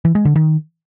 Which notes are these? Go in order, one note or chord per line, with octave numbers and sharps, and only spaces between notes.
E3
G#3
D3
D#3